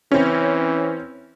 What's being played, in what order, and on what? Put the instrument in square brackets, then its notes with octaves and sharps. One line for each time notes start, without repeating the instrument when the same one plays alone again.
[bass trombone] E3 [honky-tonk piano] C4 C#4